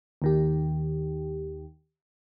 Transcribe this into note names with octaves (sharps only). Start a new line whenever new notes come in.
D#2 D#3 G4